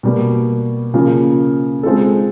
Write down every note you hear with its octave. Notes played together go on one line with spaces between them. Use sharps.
B2 G3 A#3
C#3 F3 A#3
G#3 C4 F4 A4